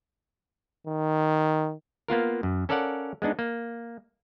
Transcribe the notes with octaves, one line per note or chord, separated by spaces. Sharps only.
D#3
A#3 B3 F4 A#4
F#2
C#4 A4 A#4 D5 F5 F#5
G#3 B3 D4 D#4
A#3